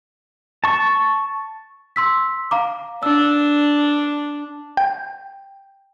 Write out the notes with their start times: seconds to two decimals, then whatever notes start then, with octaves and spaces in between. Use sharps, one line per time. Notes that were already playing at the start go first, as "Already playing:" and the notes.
0.64 A5 C#6
1.96 C6 E6 B6
2.51 F5 A#5 D6
3.03 D4 E6
4.77 G5